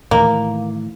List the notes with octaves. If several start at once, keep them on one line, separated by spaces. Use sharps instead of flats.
A2 D#3 E3 A#3